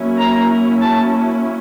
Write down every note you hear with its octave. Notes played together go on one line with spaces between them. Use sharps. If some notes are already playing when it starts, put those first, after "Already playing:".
Already playing: F#3 A#3 C#4 E4
A#5
A5